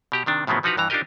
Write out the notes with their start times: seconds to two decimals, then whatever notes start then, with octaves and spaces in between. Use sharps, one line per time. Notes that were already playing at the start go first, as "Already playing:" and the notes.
0.12 B2 G4 A#5
0.26 C3 D#3 D4
0.47 A2 C#3 F3 F#3 B3 C4
0.63 E3 F3 D#4 F#4 B4 A#5
0.77 G2 E3 A#5
0.90 D4 D#4 F4 G4 A#4 D#5